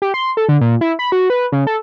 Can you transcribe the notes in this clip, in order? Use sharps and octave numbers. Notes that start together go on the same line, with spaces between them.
G4
C6
A4
D3
A#2
E4
B5
F#4
B4
C#3
A4